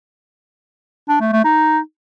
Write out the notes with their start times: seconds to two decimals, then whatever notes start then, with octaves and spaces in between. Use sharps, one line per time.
1.09 D4
1.21 A3
1.33 A3
1.45 D#4